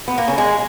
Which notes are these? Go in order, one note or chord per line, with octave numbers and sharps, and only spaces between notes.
B3
A#3
C#3
G#3